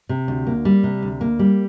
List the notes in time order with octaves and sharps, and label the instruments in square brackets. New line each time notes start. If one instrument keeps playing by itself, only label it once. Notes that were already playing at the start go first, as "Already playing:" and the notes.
[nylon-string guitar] C3
D2
A#3
G3
C3
D2
A#3
G3